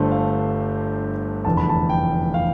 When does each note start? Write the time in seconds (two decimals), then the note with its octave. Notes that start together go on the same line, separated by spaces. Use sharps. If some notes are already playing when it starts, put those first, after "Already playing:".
Already playing: G1 G2 D3 A3 C5
0.11 F5
1.45 F1 E2 D3 A5
1.57 B5
1.69 A5
1.89 G5
2.34 F5